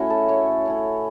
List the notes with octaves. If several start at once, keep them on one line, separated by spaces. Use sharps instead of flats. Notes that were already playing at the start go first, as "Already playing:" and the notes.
Already playing: A2 A3 C#4 E4 F#4
A4
A2 C#5
A3 C#4 E4